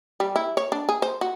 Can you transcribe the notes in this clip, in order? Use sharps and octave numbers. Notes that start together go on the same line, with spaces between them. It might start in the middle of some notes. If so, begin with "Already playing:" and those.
G3
E4
C#5
D4
G#4
C5
F#4